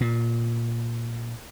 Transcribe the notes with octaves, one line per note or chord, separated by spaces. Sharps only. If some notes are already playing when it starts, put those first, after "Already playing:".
A#2